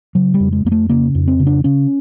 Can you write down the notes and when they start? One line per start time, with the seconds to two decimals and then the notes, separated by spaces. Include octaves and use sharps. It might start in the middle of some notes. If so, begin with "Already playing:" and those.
0.15 C#3 F#3
0.34 G3
0.40 F2
0.52 G#3
0.65 F2 A#3
0.72 A3
0.89 C#3 A#3
1.15 F2
1.28 C4
1.40 C#3
1.47 D4
1.64 C#3 C#4